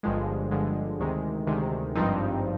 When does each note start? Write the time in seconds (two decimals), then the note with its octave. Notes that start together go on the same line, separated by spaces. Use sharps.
0.03 G1 G2 D3 F3 G#3
0.51 G1 G2 D3 F3 G#3
1.00 D2 C3 D#3 G#3
1.47 D2 C3 D#3 G#3
1.95 G#1 G2 F3 C4 D#4